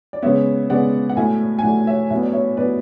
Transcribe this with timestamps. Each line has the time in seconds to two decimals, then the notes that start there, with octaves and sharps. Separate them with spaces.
0.13 D5
0.22 C#3 G#3 B3 C#5 E5
0.70 C#3 G#3 B3 D5 F#5
1.09 F#5
1.17 A2 F#3 A3 E5 G#5
1.59 G#5
1.63 A2 F#3 A3 D5 F#5
1.87 C#5 E5
2.10 A2 F#3 B3 E5
2.22 D5
2.32 C#5 E5
2.57 A2 F#3 B3 B4 D5